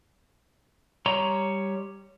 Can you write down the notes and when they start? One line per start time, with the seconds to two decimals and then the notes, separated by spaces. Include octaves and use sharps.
1.06 G3 C#5 A#5 C6